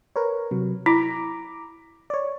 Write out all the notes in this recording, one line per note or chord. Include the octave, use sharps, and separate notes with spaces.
A#4 B4 C#5
C3 F#3
E4 A#5 D6
C#5 D5